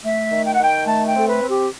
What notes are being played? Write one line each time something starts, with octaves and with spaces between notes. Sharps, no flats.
A3 E5
D#3
G5
F#5
D#3 G5
A3 A5
G5
C4 A4
B4
C4
G4